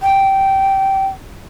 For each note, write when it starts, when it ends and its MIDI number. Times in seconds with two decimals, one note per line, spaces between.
0.01 1.06 79